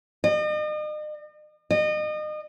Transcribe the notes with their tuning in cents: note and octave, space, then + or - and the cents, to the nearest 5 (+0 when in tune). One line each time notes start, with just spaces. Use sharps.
D#5 -40
D#5 -35